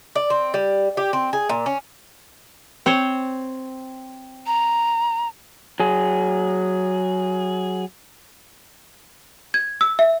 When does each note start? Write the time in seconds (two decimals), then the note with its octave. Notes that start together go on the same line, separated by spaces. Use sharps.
0.15 D5
0.30 C4
0.54 G3
0.97 G4
1.13 C4
1.33 G#4
1.49 A#2
1.66 C#4
2.86 C4 C5 C#5
4.46 A#5
5.80 F#3 G#4
9.54 G#6
9.81 E6
9.99 E5